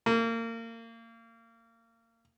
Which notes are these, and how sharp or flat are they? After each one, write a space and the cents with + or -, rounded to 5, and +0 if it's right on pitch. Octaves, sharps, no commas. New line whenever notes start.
A#3 -30